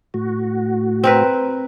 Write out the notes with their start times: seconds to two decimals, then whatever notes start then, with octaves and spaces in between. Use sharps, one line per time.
0.14 A2 F#4
1.04 C4 A#4 B4